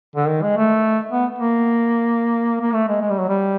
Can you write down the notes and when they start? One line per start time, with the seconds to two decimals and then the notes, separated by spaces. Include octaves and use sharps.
0.16 D3
0.28 D#3
0.42 G#3
0.57 A3
1.11 B3
1.38 A#3
2.61 A#3
2.73 A3
2.88 G#3
3.01 G#3
3.10 G3
3.19 F#3
3.28 G3